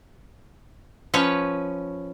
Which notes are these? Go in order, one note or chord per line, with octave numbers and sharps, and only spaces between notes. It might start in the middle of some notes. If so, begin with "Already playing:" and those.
F3 C#4 B4 C#5